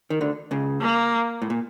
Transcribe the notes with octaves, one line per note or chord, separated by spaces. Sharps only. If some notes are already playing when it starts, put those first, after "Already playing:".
D#3
D2 D3
C#2 C#3
A#3
A2
A#2